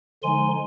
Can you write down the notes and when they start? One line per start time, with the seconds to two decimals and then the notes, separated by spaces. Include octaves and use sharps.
0.23 D3 F3 G#3 D#4 G#5 C6